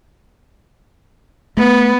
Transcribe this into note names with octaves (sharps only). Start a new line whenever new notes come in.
A3 B3